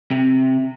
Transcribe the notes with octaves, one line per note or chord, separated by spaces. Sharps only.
C3